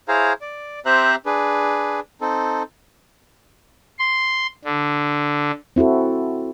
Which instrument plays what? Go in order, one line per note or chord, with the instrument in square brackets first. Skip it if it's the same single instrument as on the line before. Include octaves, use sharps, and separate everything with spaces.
[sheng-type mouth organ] E4 G#4 C5 C#5 F5 A#5
D5
C4 G4 C5 E5 A#5 F#6
D4 G#4 B4
C4 D#4 A4
[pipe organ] C6
D3
[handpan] C4 E4 F#4 A4